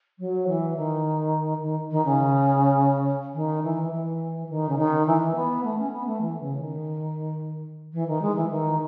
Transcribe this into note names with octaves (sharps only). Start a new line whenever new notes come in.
F#3
E3
D#3
D#3
D#3
C#3
D#3
E3
E3
D#3
C#3
D#3
E3
B3
A3
C#4
B3
A3
E3
C#3
D#3
E3
D#3
G#3
E3
D#3